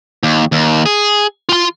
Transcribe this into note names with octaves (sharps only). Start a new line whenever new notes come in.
D#2
D#2
G#4
F4 C6